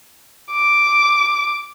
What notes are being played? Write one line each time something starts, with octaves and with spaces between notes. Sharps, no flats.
D6